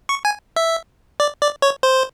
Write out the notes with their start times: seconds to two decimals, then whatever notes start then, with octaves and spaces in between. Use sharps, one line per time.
0.09 C#6
0.25 G#5
0.56 E5
1.20 D5
1.41 D5
1.62 C#5
1.83 C5